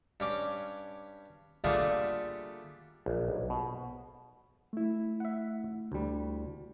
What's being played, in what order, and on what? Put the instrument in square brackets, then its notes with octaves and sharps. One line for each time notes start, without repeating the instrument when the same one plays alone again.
[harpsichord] G2 C#4 D6
D3 G3 A3 A#3 F4 G#4
[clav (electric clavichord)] A#1
B1
B2
[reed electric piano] A3 E4
[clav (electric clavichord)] E5 F#5
D2 G3